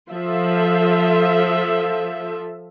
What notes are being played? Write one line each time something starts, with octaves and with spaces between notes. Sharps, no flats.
F3 F4 A4 E5